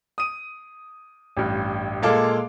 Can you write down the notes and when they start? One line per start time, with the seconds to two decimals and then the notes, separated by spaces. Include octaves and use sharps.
0.18 D#6 D#7
1.37 A1 G2
2.03 A#2 G#3 A4 F5 D6